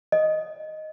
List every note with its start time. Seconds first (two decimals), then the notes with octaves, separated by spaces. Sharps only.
0.12 D#5